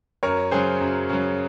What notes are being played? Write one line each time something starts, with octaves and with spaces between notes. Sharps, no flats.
F#2 A#4 C#5
C#3 F#3 G#4 C5
F#2
C#3 F#3